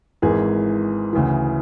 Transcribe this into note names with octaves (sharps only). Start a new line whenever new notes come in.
G#1 G#2 E3 G#4
D2 C#3 E3